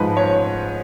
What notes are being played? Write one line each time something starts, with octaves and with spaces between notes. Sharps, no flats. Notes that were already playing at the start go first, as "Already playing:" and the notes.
Already playing: G#2 F3 B4
C#5